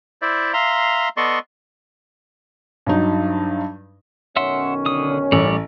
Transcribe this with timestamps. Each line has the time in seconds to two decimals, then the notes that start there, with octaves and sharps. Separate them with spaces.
0.22 E4 C5 D5 E5
0.53 E5 F5 A#5 C6
1.17 B3 A4 D5 D#5 C6 C#6
2.86 G2 F#3 D#4
4.36 B1 D#3 C#4 E5 F#5 C6
4.86 D3 D#6
5.32 A1 G3 A3 C#5 D5